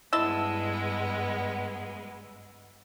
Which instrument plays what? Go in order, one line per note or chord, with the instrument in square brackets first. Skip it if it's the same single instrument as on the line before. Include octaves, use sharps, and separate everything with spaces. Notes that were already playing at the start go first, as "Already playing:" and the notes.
[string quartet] G2 G#3 B3 [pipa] E4 D#5 A5 [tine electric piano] E6